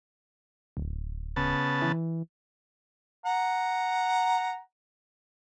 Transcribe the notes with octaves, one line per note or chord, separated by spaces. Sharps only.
D1
C#3 B3 A5
E3
F#5 A#5